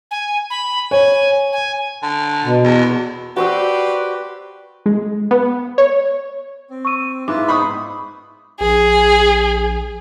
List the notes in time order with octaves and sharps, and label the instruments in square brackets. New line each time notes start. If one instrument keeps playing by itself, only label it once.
[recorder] G#5
B5
[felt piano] C#5 [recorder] G#5
[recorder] G#5
[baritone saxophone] D3
[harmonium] B2
[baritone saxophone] E2
[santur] F#4 C5 E6 [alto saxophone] G4 [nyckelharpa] B4 D5
[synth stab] G#3
B3
C#5
[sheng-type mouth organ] C4
[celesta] C#6 E6 D#7
[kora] G#2 [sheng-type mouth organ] E4 F4 B4 [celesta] D6
[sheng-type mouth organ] B3 D#4 C5 [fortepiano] B5 C#6 D#6
[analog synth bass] A#1 [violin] G#4